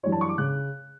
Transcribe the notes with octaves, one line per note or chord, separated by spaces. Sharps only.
F#2 E3 G3 D4 C#5
A5
C#6
D6
C#3 F#6